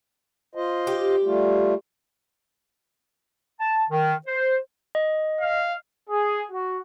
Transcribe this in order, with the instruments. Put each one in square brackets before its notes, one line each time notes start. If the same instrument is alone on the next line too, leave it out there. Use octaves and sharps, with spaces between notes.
[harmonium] F4 C5 D#5
[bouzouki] G4
[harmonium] G3 A3 F4
[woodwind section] A5
D#3
C5
[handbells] D#5
[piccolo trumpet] F5
[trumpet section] G#4
F#4